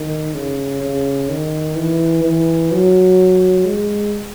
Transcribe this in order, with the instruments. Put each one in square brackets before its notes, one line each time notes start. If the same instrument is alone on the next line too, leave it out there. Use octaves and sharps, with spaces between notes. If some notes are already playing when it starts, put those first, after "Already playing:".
Already playing: [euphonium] D#3
C#3
C#3
D#3
E3
E3
F#3
G#3